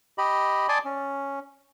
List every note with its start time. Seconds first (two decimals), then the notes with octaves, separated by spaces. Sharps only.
0.18 G4 D#5 B5
0.69 D5 G#5 A5 C6 D6 D#6
0.85 C#4